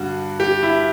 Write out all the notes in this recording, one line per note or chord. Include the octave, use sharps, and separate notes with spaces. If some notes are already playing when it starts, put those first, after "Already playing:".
Already playing: G2 D3 F#4
G4
E4